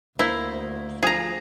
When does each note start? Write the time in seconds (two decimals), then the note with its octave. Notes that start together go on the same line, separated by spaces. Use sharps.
0.19 D2 A#3 E4 C5
1.03 F3 G#4 A#5